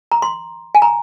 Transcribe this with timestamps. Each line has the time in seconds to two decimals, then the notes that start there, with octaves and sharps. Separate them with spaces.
0.12 A#5
0.22 C6
0.75 G#5
0.82 A#5